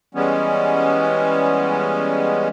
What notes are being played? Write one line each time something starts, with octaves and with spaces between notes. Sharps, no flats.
E3 G3 G#3 B3 C#4